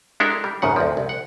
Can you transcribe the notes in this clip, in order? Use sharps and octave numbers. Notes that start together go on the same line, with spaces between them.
G#3 D4 E4 G4 A4 A#4
G3
G#1 F#2 C#3 F#5
D2 F3
C2
F#5